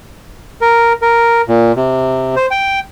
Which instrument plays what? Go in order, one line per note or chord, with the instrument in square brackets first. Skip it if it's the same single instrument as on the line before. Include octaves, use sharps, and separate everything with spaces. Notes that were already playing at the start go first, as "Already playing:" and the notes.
[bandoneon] A#4
A#4
A#2
C3
C5
G5